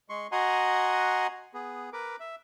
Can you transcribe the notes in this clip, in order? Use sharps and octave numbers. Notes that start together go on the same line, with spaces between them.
G#3 C6 C#6
F#4 D#5 F#5 G#5 A#5 C6
B3 G#4
A#4 B4 D6
E5